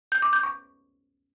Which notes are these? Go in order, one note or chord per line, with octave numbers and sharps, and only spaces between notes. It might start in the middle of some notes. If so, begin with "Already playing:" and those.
G6
D6
G6
C#6